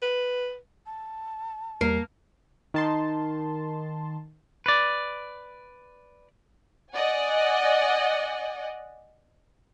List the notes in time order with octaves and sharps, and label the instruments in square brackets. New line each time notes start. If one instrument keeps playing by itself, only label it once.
[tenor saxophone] B4
[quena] A5
[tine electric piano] E2 G3 C7 [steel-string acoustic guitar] A#3 [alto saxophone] A#4
[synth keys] D#3 A5 C6
[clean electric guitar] B4 D5
[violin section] D5 D#5 F#5 G#5